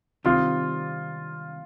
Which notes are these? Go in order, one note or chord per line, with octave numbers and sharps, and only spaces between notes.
C3 D#3 G3 C4 F4